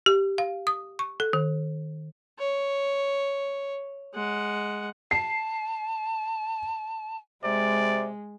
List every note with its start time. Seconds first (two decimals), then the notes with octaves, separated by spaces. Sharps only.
0.06 G4
0.38 F5
0.67 D#6
0.99 C#6
1.20 A4
1.33 D#3
2.39 C#5
4.14 G#3 F#5
5.11 A5 C7
7.44 C3 G#3 D5